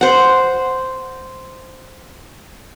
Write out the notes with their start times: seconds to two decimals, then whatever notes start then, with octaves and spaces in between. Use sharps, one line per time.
0.01 C5 F#5